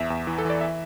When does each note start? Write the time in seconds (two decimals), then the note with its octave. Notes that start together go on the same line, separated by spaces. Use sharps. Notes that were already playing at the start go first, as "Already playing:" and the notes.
Already playing: E2 E5
0.10 E2
0.27 E3
0.38 A4
0.45 E3
0.50 D5
0.61 E5